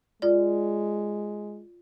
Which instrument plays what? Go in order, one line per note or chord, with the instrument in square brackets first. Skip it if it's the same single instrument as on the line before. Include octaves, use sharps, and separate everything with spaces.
[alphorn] G#3 [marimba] F4 D5